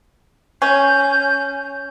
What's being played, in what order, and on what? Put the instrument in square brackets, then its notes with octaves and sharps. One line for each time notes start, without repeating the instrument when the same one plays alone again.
[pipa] C#4 [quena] G6